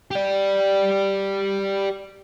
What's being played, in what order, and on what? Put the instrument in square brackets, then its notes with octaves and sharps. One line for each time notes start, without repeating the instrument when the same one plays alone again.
[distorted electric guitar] G4 D5